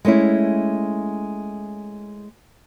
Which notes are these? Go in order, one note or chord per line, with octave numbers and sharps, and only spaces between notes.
G#3 A3 C#4 E4